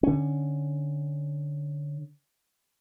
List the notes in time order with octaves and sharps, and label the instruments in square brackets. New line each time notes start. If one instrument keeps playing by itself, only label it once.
[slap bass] D3 C#4